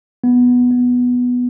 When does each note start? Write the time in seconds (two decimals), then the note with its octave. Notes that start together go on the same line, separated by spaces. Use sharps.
0.24 B3
0.71 B3